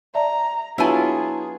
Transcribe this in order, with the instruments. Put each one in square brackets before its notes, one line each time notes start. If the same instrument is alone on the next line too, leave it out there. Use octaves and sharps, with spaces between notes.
[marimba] D5 E5 A5 [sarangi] A#5
[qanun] F#3 B3 F4 [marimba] D4 [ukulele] E4 G#5 A5 [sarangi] G#4